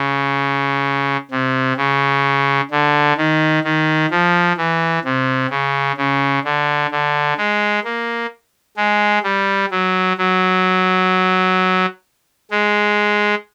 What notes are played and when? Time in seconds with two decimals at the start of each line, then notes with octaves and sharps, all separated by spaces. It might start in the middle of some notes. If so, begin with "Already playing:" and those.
Already playing: C#3
1.31 C3
1.77 C#3
2.71 D3
3.17 D#3
3.64 D#3
4.11 F3
4.57 E3
5.05 C3
5.50 C#3
5.97 C#3
6.44 D3
6.91 D3
7.38 G#3
7.84 A#3
8.77 G#3
9.24 G3
9.71 F#3
10.18 F#3
12.51 G#3